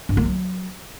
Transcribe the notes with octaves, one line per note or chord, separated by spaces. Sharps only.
G2
A#3
F#3